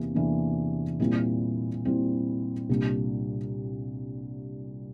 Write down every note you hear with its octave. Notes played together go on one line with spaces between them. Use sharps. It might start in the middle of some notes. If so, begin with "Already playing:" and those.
Already playing: E2 C3 E3 A#3 D4
E2 C3 E3 A#3 D4
A#2 G3 C4 E4
A#2 G3 C4 E4
C2 A#2 G3 D4